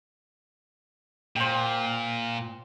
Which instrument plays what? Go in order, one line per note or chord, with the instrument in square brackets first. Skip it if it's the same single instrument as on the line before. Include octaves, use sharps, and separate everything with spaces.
[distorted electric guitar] A#2 [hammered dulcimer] C5 G5